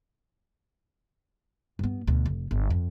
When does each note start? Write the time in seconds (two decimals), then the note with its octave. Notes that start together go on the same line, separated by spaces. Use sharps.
1.79 G2 B3
2.07 D2 B2
2.26 F1
2.51 G1
2.70 F2